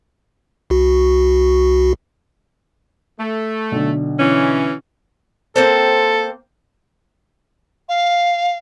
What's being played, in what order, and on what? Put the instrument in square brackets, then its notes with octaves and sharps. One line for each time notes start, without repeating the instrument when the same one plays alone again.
[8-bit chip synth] C2 F#4
[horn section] A3
[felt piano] B1 D3
[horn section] E3 C#4
[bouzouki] A#3 C4 C5 [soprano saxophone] A4
[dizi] F5